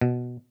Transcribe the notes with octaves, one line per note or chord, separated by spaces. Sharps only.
B2